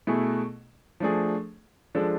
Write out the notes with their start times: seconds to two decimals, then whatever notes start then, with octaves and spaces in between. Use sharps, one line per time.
0.07 B2 A3 E4 G#4
1.00 F3 A3 D4 G#4
1.95 F3 G#3 D4 A4